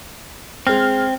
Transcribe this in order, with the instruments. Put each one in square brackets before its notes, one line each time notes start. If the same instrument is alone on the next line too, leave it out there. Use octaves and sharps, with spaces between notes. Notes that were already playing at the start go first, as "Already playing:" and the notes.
[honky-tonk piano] G#3 F6 [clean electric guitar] C4